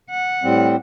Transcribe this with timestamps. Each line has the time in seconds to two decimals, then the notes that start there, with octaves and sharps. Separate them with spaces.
0.10 F#5
0.43 A2 G3 C4